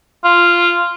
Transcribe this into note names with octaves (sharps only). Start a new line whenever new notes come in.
F4